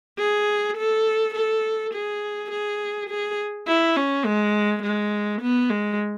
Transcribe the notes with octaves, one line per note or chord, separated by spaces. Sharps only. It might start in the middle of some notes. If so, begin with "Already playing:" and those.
G#4
A4
A4
G#4
G#4
G#4
E4
C#4
G#3
G#3
B3
G#3